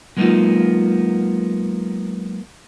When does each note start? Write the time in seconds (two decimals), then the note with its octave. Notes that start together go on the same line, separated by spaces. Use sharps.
0.16 F#3 G#3 A#3 B3 D#4 F4